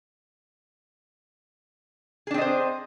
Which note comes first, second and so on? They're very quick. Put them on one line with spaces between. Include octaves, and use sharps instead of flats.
G#4 D4 C4 D#5 C5